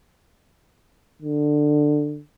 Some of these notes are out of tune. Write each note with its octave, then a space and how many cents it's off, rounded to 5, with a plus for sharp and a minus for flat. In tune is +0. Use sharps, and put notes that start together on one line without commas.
D3 +15